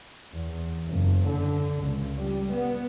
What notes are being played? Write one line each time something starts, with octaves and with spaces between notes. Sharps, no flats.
E2
F#1
D3
C#2
G3
B3